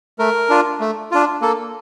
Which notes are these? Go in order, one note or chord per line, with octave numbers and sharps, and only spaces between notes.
A3 A#4
D4 F4
A3
D4 F4
A#3 A4